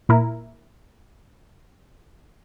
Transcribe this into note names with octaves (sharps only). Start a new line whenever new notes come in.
A#2 E4 A#4